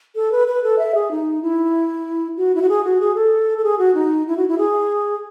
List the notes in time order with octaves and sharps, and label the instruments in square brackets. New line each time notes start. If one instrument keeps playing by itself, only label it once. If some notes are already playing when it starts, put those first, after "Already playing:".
[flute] A4
B4
B4
A4
E5
G#4
D#4
E4
F#4
E4
F#4
G#4
F#4
G#4
A4
A4
G#4
F#4
D#4
E4
F#4
E4
G#4